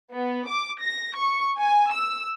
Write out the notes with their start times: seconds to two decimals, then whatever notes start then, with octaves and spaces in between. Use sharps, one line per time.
0.12 B3
0.47 D6
0.81 A#6
1.15 C#6
1.59 G#5
1.92 E6